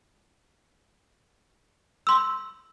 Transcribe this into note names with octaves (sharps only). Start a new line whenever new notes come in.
C6 E6